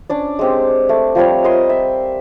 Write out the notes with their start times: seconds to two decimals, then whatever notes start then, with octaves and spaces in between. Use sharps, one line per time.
0.10 C#4 D4 D5
0.39 G#3 C4 G4
0.89 A3
1.15 F3 G3 C4 C#5
1.44 A#4 D#5 E5 C6
1.69 E5